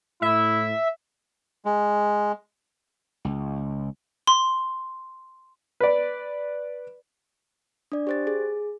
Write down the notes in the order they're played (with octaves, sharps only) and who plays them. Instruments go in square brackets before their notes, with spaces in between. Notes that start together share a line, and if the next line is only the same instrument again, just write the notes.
[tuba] A2 [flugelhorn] E4 [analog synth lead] E5
[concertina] G#3
[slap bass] C#2
[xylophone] C6
[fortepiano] B4 D5
[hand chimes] D4 D5
G4 C5 A6
G#4